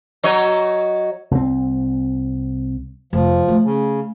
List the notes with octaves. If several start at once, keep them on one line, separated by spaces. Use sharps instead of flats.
F#3 C#5 D#5
C2 C4
F1 F3
A3
C#3